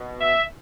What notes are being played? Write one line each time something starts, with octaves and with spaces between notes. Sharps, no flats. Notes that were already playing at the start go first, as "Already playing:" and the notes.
Already playing: B2
E5